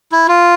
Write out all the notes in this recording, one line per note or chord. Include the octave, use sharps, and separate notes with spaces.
E4
F4